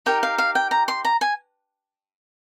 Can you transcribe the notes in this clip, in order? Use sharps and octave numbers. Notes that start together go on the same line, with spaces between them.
D#4 G4 A#4 G5
F5
F5
G5
A#5
C6
A#5
G#5